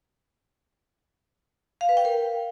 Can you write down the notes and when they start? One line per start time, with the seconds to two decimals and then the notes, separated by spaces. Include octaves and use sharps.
1.81 F5
1.89 B4
1.97 G5
2.05 A#4